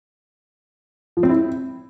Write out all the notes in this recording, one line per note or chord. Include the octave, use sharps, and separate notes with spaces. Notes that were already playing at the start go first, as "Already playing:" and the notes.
F3
C4
E4